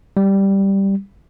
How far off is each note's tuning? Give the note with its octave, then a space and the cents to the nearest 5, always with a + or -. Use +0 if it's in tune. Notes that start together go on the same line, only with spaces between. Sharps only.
G3 +0